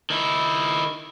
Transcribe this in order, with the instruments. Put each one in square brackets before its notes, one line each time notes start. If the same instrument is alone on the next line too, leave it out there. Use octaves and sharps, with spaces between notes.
[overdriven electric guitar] D#3 E4